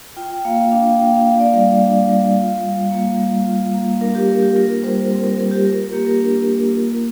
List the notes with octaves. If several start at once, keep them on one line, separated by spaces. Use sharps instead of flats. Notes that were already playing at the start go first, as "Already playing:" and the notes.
F4 G5
G5
A#3 F5
F5
D4 F5
A#3 G5
F5
F4 F5
D5
G3 F5
F5
D4 F5
G3
F4
G3
A#3
G3
F4
A#3
D4 A#4
G4
A#3 A#4
G4
F4 A#4
G3 C5
C4 A#4
A#4
G3 A#4
G4
F4 A#4
A#4
A#3 G4
A#4
D4
A#3
F4